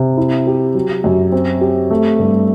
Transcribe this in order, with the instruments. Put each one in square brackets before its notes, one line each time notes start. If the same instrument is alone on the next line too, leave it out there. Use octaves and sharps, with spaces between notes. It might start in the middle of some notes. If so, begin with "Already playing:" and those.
Already playing: [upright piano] C3
E4
G4
F#3
F#2
C4
G4
A3
G2